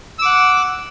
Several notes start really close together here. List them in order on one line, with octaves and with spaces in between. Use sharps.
E6 D6 F#5